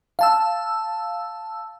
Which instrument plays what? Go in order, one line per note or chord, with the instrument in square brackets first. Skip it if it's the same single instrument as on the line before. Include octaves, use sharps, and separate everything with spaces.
[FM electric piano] F5 A5 E6